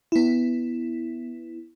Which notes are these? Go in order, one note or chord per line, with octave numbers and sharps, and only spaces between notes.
B3 E4